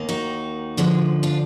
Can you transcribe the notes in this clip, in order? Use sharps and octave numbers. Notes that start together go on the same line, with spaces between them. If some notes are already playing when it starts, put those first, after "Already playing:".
Already playing: D#2 D#3 A#3
D#4 F#4
D2 D3 F3 G#3
D4 F4